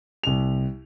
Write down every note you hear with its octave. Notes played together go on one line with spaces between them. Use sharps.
C2 F7